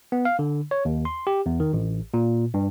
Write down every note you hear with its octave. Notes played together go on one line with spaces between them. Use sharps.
B3
F5
D3
C#5
D#2
C6
G4
E2
D#3
A1
A#2
G2